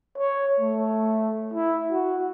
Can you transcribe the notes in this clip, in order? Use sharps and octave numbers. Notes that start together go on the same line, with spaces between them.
C#5
A3
E4
F#4